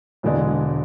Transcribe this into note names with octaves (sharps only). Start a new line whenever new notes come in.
E1 E2 D3 G#3 D4